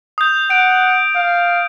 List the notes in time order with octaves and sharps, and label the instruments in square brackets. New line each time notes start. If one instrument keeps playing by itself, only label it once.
[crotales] D#6 G6
[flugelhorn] F#5 [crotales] D7
[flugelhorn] F5